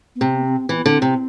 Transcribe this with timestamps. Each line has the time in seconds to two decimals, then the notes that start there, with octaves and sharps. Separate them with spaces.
0.15 B3
0.20 C3 C4
0.39 B3
0.45 C4
0.69 E3 C4
0.76 B3
0.84 D3 C4
1.02 C3